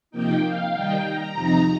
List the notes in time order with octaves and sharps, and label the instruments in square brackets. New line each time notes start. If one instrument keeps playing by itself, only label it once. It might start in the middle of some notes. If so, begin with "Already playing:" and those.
[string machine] C3 F3 A#3 D#4 G5
F5
D#3 G3 D#4 G5
A#5
F2 C3 F3 D#4